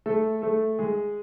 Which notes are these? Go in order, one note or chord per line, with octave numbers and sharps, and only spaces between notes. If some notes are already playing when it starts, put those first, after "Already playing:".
A3 A4
A3 A4
G#3 G#4